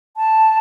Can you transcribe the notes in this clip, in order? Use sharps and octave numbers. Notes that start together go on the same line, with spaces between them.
A5